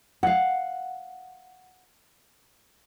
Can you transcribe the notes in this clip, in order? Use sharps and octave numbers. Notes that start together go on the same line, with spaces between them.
F5 F#5